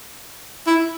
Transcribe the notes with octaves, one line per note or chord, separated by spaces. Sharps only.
E4